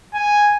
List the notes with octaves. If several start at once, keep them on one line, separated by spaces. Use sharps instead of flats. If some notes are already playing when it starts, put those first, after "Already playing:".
G#5